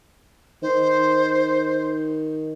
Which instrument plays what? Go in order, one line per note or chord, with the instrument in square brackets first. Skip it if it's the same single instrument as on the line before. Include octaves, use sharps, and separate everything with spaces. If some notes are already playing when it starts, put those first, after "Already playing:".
[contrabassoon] D#3 [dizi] C5